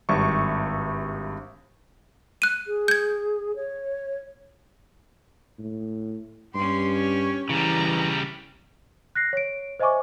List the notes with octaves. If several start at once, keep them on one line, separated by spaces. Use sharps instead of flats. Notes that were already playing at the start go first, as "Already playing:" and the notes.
G#1 G2 E5 C#6
F#6 D#7
G#4
G6 G#6
C#5
A2
G2 C#4 G4 C6
C#5
C#3 E3 G3 A#5
F#6 A#6 C7
C#5 D7
C5 D#5 E5 G#5 C#6 D6